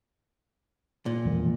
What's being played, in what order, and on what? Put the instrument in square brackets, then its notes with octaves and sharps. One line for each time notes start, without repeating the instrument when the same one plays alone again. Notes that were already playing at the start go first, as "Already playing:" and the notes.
[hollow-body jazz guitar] A#2
[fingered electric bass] E1 F3 A#3